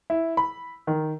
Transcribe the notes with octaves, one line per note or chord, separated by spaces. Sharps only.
E4
B5
D#3